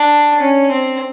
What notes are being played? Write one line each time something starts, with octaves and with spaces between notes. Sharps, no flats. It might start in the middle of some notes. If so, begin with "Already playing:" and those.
Already playing: D4
C#4
C4